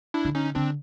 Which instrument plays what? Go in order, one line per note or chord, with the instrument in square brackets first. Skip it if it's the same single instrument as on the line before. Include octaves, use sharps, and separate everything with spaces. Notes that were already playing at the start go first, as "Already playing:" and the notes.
[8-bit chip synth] D4 E4
[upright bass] D3
[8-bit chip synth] C#4 D#4
[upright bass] D3 [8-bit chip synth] C4 D4